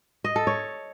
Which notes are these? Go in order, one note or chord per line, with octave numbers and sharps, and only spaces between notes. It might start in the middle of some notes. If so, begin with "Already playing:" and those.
D#5
A4
C#5